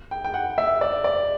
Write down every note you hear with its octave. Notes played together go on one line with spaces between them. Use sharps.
G5
G5
F#5
E5
D5
D5